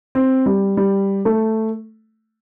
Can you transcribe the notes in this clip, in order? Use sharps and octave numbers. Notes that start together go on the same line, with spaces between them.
C4
G3
G3
A3